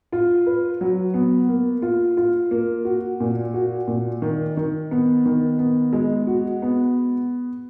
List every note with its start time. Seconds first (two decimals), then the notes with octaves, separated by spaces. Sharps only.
0.12 F4
0.46 B4
0.81 F#3
1.14 B3
1.49 A#3
1.82 F4
2.17 F4
2.51 A#3
2.85 F#4
3.20 A#2
3.54 F#4
3.87 A#2
4.22 D#3
4.57 D#3
4.91 B3
5.25 D#3
5.59 B3
5.93 G#3
6.27 F#4
6.62 B3